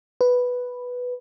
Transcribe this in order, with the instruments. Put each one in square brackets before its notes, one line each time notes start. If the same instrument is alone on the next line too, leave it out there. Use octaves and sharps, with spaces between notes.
[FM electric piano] B4